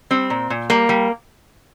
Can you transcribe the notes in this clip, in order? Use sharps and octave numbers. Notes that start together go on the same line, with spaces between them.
G3 C4
A#2
A#2
G3 A#3
G3